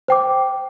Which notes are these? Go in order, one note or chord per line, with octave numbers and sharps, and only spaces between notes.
C5 G5 D6